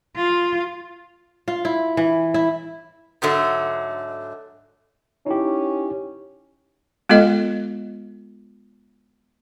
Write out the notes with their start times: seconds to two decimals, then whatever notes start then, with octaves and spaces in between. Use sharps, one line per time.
0.16 F4
1.48 F4
1.65 E4
1.97 E3
2.34 E4
3.22 G#2 D3 F#3 A3
5.26 C#4 D#4 E4 G4
7.09 G#3 B3 F4 A4 D#5